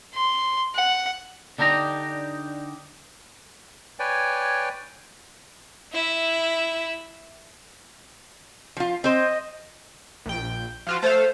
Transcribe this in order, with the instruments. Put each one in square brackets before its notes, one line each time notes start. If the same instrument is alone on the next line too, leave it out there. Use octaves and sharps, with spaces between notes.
[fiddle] C6
F#5
[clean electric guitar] D3 D4 D#4 G4 A#5
[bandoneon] B4 C#5 D5 G5 G#5
[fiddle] E4 E5
[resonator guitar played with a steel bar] F3 F4
[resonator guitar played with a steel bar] C4 C5 [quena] D#5
[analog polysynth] A#1 G5
F3 F4 F#4
[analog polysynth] A3 A4 F5 [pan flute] C5